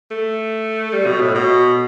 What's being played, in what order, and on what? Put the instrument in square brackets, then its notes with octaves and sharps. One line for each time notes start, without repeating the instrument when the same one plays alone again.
[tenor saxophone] A3
G3
B2
A2
B2